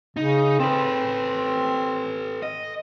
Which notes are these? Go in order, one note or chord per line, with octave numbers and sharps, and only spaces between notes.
C#3 D#4
C4 A4 B4
D#5